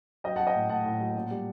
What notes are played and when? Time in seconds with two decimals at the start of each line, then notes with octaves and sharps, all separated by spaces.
0.24 F#3 D#5 G5
0.36 F#3 F#5 A5
0.47 D#5 G5
0.55 A2
0.69 A2 F#5 A5
0.85 A2
1.01 F#3
1.15 A#2
1.31 G3